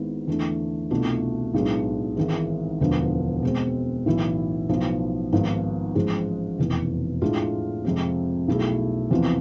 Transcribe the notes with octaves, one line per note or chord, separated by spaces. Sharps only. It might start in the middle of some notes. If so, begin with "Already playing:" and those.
Already playing: G#1 G#2 G#3 B3 E4
E2 D3 A3
C2 B2 A3 D4 F4
B1 A2 G#3 B3 D4
G#1 G#2 E3 G#3
E1 D2 D3 F3 B3
B2 G#3 C4
B1 A2 E3 B3 E4
B1 A2 F3 B3
G#1 G#2 F3 B3
A1 G#2 F3 G#3
F1 E2 B2
A2 G#3 D4 F4
F2 C3 F3 G#3 C4
B1 B2 A3 E4 G#4
E2 C3 F3 B3 F4